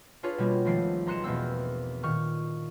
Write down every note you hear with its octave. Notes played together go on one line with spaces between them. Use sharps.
D4 F4 G#4 B4 C#5
B2 G3 A#3 B3
G#1 F3 A3 C7 D7
B1 A#5 C6 F#6 C#7 E7
E2 B2 A#3 C4 E6
A#2 D#3 C#6 F6